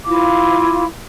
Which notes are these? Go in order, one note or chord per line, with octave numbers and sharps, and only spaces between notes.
E4 F4 F5 D6